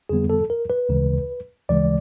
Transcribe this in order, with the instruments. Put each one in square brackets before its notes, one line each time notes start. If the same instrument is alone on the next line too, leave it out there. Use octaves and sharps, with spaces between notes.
[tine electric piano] F2 D3 G3 B3 G#4
A4
A#4
B4
D2 C#3 E3 G#3
D2 C#3 E3 G#3 D5